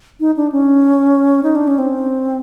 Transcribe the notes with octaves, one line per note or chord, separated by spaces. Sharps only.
D#4
D4
C#4
D#4
D4
C#4
C4